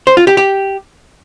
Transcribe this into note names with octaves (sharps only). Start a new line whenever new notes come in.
C5
F4
G4
G4